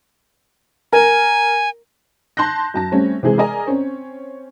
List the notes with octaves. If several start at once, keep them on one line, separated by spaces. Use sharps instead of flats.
A#4 G#5
A5 C6 F#6 G6 A#6
F#2 A5 A#6
G3 A3 C4 C#4
C3 E3 G#3 G#4
G#4 A#4 D5 D#5 G#5 A#5
C4 C#4